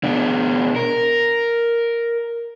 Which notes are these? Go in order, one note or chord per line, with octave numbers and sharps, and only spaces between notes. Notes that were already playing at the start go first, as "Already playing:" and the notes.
B2 D4
A#4